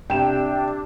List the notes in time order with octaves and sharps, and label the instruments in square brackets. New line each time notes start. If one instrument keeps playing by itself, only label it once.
[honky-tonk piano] C3 E7 [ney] D4 [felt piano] G5